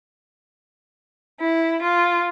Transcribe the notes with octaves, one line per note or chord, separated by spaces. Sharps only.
E4
F4